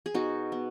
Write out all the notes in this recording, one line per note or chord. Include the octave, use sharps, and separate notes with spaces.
G#4
B2 D#4 F#4
B3